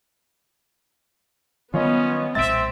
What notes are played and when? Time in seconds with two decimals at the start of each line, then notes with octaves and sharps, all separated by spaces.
1.74 D#3 F#3 G3 B3 C#4 F4 C#5 D#5
2.35 B1 A#2 G#3 C4 E5 A6 D7